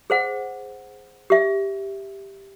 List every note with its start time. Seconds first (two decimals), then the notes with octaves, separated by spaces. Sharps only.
0.10 G#4 C5 F#5
1.30 G4 E5